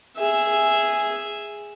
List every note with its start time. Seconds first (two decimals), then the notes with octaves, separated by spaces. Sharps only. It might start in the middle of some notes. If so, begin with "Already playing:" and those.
0.18 G#4 E5